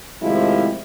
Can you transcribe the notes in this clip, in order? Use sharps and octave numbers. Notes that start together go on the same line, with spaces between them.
A2 C3 D#3 F3 G#3 E4